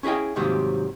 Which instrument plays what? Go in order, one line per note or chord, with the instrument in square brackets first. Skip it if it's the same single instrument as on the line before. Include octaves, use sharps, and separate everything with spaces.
[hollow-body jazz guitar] C#4 E4 G#4 D#5 G5
G#2 C3 D#3 F#3 G3 A#3